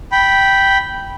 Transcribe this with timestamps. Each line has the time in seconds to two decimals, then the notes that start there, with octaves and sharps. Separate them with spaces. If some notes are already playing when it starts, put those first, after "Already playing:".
0.12 G5 B5